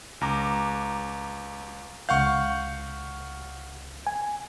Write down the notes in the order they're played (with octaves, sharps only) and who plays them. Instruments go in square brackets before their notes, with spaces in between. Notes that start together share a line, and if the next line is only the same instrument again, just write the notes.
[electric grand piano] C#2 A#5 D6
[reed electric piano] C#2 G6 [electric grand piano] F5 F#5 C#6
[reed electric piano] G#5